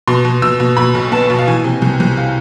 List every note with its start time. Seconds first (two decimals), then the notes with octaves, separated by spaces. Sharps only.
0.07 B2 C6
0.25 B2
0.42 B2 E6
0.60 B2
0.77 B2 B5
0.95 B1
1.12 B3 A5
1.30 B2
1.39 F5
1.47 E3 G#5
1.64 C3
1.82 C2
2.00 C2
2.17 F5